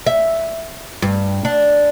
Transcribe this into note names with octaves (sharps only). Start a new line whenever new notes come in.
E5
G2
D4